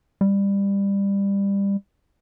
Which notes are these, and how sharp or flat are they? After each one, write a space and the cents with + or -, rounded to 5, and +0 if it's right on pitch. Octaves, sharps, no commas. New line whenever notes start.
G3 +20